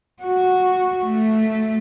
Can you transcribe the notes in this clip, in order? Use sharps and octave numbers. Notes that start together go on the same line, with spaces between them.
F#4
A3